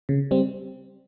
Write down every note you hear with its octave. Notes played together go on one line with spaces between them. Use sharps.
C#3
G3 C4